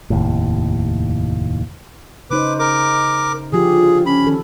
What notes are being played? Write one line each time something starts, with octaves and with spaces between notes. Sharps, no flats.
F1 D#2 A2
C#3 D#4 B4 C5 D6
A#4 D6
D3 F3 F4 G4 G#4
C#4 B5
D#3 A4